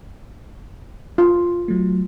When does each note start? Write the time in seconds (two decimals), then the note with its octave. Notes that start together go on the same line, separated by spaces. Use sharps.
1.18 F4
1.68 F#3 A3